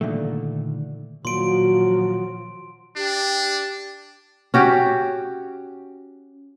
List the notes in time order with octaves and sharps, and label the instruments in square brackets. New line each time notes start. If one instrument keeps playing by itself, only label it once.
[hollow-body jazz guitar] A#2 D3 D#3 A3
[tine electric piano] A#2 D#3 [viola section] F3 F#4 [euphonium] F#3 [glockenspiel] C6 D7
[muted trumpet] D4 [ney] G4
[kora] C#4 F#4 G4